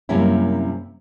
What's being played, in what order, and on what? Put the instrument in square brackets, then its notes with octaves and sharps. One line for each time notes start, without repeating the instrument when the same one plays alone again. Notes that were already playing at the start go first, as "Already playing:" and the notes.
[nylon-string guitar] F#2 C3 G3 A#3 C#4 E4